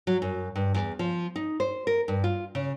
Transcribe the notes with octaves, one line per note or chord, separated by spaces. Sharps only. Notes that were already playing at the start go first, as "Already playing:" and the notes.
F#3
F#2
G2
E2
F3
D#4
C5
A#4
G2
F4
C#3